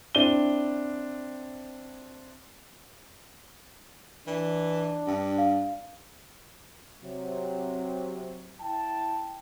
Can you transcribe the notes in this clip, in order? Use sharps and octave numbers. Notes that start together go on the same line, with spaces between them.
C4 D4 E4 D#7 G7
E3 D4
G2
F5
C3 F#3
E4 G5 A5